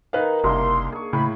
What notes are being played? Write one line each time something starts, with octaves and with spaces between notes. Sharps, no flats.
D#3 D#4 B4 F5
F#1 C2 A#3 D4 C6
G#4 C#6
A2 C#3 B5